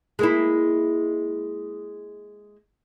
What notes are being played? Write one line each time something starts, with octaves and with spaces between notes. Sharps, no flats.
G#3 A#3 E4